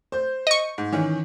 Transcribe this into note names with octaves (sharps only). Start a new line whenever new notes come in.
C5 G6
D#5 C#6
G#2
D#3 E3 C#4